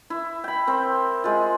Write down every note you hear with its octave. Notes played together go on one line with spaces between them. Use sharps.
E4
G5 B5
C4 A#4
G#3 F4